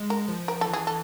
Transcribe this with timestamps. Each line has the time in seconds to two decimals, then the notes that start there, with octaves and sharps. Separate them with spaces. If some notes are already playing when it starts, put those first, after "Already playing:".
Already playing: G#3
0.10 A#4
0.29 F3
0.48 A#4
0.61 A4
0.67 E3
0.73 G#4
0.87 A4